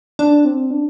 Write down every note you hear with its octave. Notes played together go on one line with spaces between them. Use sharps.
D4
C4
D4